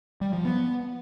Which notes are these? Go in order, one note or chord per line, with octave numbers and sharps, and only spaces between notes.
G3
F3
B3